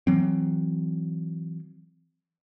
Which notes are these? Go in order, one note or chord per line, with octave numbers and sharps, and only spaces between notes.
E3 F#3 C4